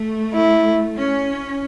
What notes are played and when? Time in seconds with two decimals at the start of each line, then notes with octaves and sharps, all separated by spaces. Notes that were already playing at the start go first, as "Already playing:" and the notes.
Already playing: A3
0.34 E4
0.97 C#4